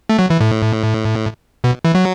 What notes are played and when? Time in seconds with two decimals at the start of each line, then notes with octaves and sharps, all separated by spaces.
0.09 A3
0.19 F#3
0.30 E3
0.40 A2
1.64 B2
1.85 E3
1.95 F#3